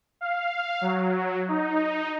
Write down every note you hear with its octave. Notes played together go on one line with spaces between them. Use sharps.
F5
F#3
D#4